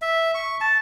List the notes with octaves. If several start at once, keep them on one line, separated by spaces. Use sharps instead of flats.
E5
C#6
A5